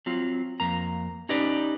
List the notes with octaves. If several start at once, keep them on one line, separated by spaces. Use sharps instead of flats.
F#3 C4 F4
F2 A#3 A#5
C#4 D#4 G4 B4 D5